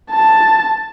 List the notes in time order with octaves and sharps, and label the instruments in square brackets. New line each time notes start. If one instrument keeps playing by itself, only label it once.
[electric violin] A5